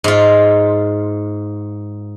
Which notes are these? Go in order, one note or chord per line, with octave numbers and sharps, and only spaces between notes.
G#2 F4